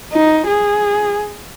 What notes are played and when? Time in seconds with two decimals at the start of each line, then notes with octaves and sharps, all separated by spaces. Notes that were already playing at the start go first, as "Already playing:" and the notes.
0.13 D#4
0.47 G#4